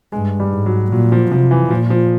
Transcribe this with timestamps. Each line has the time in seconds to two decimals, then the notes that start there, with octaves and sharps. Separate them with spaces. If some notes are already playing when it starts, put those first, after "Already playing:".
0.12 G2 G#3
0.40 G3
0.52 G#2
0.66 F#3
0.92 A#2 F#3
1.12 F3
1.32 C3 F3
1.51 E3
1.70 A#2 F3
1.90 F3